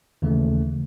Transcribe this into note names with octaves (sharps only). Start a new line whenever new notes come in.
D#2 C#3 E3 A3